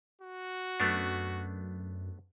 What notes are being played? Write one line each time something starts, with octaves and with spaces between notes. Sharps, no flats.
F#4
F#2 A3 B3 D4